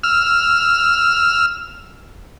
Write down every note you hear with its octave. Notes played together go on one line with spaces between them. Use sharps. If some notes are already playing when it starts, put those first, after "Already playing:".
E6 F6